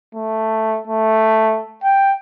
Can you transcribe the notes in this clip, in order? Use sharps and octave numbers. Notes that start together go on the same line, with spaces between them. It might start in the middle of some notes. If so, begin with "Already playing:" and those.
A3
A3
G5